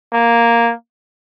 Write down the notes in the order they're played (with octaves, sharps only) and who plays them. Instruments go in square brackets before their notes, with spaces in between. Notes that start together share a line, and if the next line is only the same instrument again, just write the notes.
[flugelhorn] A#3